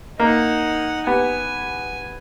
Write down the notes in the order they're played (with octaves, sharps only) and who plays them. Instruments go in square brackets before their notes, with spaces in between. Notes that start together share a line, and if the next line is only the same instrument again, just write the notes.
[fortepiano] A#3 [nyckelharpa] D#4 F#5
[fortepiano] B3 G4 [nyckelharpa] G#5